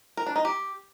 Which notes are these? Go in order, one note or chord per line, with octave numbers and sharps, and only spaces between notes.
A#4
D4
D#4
G4